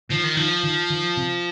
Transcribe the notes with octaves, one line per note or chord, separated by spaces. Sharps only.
D#3 F3
D#3
D#3 F3
D#3
D#3
C3